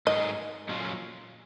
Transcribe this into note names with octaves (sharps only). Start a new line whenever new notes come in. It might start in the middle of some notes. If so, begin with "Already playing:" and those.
G#2 F#3 A#3 D#4 G#4 D#5
A#2 F#3 C#4 F4